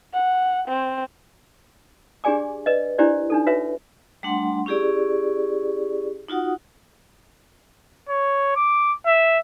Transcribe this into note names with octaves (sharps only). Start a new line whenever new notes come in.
F#5
C4
D4 G4 G#4 D5 G#5 D6
B4 D5 D#5
D4 E4 G4 C5 D5
D4 D#4 A4
F#4 B4 C#5 E5
G3 A3 D4 F#5 C6
C#4 E4 G4 G#4 D5
D#4 F4 F#4 F#5 D#6
C#5
D6
E5